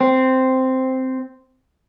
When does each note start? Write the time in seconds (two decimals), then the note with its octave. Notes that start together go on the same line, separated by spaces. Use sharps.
0.01 C4